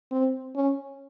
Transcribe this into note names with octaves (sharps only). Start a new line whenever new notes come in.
C4
C#4